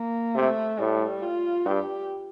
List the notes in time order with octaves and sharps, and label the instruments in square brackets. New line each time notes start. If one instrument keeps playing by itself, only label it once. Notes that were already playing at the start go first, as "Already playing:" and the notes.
Already playing: [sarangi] A#3
[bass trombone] C3 [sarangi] A3
[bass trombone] A2 [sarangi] G3
[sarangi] F4
[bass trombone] G2 [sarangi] G4